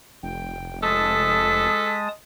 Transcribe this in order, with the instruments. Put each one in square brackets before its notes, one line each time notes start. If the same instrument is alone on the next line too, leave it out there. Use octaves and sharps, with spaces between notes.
[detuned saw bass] F1 [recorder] G5
[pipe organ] G#3 A5 D#6 [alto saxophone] A4 [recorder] B6